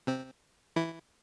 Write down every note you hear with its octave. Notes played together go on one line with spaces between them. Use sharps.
C3 C4
E3 E4